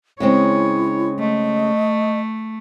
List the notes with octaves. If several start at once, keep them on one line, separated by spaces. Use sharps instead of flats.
C#3 G#3 C4 E4 C#5
A3 D#5